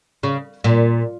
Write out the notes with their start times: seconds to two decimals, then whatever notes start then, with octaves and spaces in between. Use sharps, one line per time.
0.23 C#3
0.64 A#2